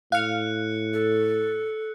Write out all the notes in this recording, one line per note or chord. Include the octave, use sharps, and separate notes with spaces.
A2 F5 F6 F#6 C#7
A4